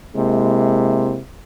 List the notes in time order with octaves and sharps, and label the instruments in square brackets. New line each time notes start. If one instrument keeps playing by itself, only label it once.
[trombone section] C3 G#3 A#3 E4